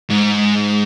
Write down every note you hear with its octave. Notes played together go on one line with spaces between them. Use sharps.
G#2